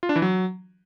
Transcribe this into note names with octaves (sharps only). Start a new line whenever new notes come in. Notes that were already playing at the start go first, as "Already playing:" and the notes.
F4
D4
E3
F#3